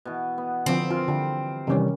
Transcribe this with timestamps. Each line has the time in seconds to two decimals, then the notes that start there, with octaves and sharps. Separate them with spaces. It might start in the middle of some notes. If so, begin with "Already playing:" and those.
0.05 B2 E3
0.38 B3
0.66 D3 F3 C4
0.91 F4 A#4
1.08 D3 E3 G3
1.67 C3 D#3 E3 G3 C#4